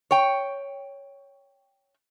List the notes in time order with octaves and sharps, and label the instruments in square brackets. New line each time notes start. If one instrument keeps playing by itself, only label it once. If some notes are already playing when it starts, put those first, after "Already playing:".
[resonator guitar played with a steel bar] C#5 G5